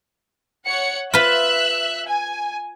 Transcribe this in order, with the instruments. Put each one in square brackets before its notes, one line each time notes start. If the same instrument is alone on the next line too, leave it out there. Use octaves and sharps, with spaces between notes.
[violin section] C#5 F#5 C#7
[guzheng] F4 B4 [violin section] E5 E6 F#6
[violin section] G#5